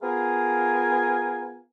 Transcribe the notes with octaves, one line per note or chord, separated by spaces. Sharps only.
B3 F4 G#4 A#4 F5 G#5